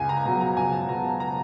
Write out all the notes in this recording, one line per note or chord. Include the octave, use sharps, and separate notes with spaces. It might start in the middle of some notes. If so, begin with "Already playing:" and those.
Already playing: C#2 G#5
A#5
B2 F#3 A#5
A#5
C#2 G#5
A5
B2 F#3 A#5
A5
A#5